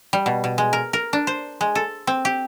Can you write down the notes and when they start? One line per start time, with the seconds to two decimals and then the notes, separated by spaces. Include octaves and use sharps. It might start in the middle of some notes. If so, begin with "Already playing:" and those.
0.13 G3
0.26 B2
0.44 B2
0.58 G#3
0.73 A#4
0.93 A#4
1.13 D4
1.27 C5
1.61 G#3
1.75 A4
2.07 C4
2.25 G4